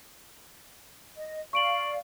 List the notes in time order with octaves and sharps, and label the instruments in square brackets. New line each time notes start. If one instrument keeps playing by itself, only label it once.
[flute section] D#5
[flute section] D5 F5 [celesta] C#6 D7 F#7